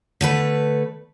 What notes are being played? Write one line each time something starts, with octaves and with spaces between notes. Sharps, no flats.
D3 A3 B4